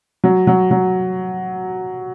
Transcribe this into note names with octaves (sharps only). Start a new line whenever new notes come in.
F#3
F#3
F#3